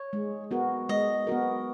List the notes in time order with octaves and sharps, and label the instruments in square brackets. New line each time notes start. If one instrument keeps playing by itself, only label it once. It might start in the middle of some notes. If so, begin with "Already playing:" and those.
Already playing: [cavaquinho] C#5
[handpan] G#3
B3 F#4 A#4
[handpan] G#3 [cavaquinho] D#5
[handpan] B3 F#4 A#4